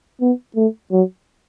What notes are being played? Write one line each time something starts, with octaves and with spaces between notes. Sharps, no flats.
B3
A3
F#3